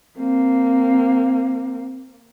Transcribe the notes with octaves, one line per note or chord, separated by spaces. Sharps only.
A#3 C4